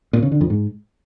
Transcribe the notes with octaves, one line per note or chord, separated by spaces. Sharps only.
A#2
C#3
D3
F2
G#2